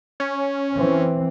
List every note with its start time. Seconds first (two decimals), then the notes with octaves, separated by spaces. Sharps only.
0.20 C#4
0.76 E3 C4